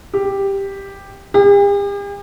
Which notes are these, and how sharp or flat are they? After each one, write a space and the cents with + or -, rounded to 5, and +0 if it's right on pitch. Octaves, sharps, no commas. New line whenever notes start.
G4 +5
G4 +45